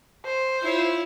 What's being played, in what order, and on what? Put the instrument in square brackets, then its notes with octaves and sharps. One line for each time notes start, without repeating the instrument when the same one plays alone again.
[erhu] C5
[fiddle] E4 C#5 [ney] F4